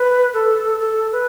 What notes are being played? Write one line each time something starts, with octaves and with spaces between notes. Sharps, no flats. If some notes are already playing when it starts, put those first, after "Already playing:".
Already playing: B4
A4
A4
B4